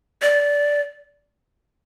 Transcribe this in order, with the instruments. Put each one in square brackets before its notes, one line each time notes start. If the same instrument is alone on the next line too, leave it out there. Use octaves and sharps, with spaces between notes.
[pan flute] D5